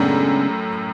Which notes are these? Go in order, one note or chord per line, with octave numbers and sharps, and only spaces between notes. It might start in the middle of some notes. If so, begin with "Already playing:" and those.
Already playing: F#2 A2 C#3 G#3 B3 D4 G#4